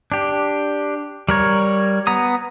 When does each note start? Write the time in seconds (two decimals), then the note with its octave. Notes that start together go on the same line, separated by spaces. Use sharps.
0.12 D4 G4
1.29 G3 A#4 C#5
2.07 B3 A#5 D#6